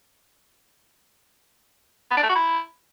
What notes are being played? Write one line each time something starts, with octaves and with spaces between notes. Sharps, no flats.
B3
D4
A3
F#4
E4